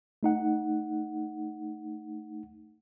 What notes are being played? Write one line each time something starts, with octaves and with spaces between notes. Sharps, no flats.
A3 D#4 F#5